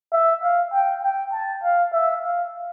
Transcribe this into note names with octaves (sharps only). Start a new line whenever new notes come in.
E5
F5
G5
G5
A5
F5
E5
F5